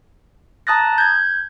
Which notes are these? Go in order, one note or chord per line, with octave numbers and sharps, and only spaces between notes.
A5 A#5 D#6 F#6 A6 A#6
G6 G#6